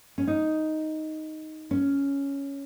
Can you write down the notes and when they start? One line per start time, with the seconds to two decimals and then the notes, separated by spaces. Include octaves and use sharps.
0.18 C#4
0.28 D#4
1.71 C#4